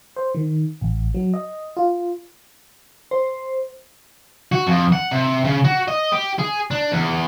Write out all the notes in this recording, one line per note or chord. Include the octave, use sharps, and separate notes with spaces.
C5
D#3
A1
F#3
D#5
F4
C5
F#4
F2
F#5
C3
C#3
F#4
D#5
G4
G#4
D4
E2